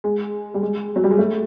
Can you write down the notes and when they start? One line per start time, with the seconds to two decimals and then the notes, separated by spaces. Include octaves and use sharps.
0.04 G#3
0.54 G3
0.62 G#3
0.96 F#3
1.04 G3
1.11 G#3
1.18 A3